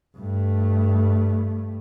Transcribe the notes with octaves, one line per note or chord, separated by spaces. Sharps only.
G2 A3